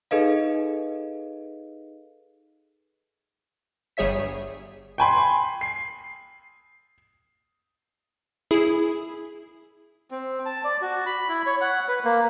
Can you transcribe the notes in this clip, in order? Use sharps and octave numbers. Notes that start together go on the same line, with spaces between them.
D#4 G#4 A4 B4 D#5 F5
G1 G3 G#4 C#5 E5 B6
G5 G#5 B5 C6
C7
E4 G#4
C4
A5
D5
F#4
B5
E4
C#5
F#5
B4
A#3